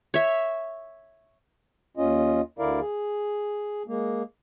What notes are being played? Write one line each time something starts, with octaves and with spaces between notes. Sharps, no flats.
C#5 E5
D#2 C#4 F4 D#5
D2 D3 E4 A#4 D5 F5
G#4
G#3 A#3